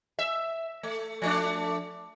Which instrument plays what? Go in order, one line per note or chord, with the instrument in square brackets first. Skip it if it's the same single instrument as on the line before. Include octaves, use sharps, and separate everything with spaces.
[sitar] E5
A3
F3 A3 D4